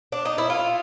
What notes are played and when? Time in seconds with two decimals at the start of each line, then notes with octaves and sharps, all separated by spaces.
0.12 D4
0.25 D#4
0.38 E4
0.50 A3 F4